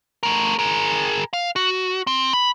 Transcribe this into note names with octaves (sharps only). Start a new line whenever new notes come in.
A3 A#4
G#4 A#4
F5
F#4
C4
B5